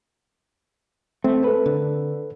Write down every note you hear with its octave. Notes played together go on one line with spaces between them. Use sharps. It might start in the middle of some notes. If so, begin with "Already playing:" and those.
A3 C4
A4 B4
D3